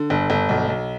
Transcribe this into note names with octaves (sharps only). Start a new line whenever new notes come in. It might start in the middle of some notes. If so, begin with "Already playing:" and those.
Already playing: D3
G1
G1
B1
B1